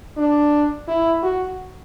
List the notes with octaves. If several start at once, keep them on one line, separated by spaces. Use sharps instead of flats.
D4
E4
F#4